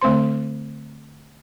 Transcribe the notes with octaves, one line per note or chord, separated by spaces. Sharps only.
D3 A3 C4 C5 C6